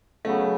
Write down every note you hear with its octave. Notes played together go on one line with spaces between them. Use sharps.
C#3 F#3 A3 B3